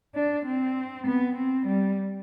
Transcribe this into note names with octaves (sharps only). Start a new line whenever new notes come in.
D4
C4
B3
C4
G3